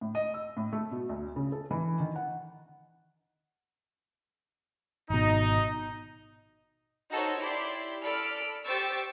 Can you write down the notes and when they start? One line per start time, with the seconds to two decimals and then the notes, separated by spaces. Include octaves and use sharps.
0.01 A2
0.15 D#5
0.34 E6
0.57 A2
0.73 A3
0.91 B2
1.09 D2
1.36 C#3
1.52 A4
1.71 E3
2.00 D#3
2.16 F#5
5.10 G#1 B2 D#4
7.10 D#4 F#4 A4 A#4 C5 C#5
7.39 E4 G4 D5 C6
8.03 A4 D5 B5 F6 D7
8.64 G4 C5 C#6 E6 A6 D7